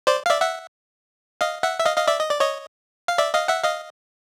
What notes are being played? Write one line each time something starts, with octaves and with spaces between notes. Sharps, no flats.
C5 D5
F5
D5 E5
E5 F#5
D#5 F5
E5 F#5
E5
D#5 F5
D#5 F5
D5 E5
D#5
D5
C#5 D#5
F5
D5 E5
D#5 F5
E5 F#5
D#5 F5